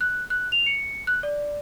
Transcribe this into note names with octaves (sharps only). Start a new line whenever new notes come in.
F#6
F#6
F7
C#7
F#6
D5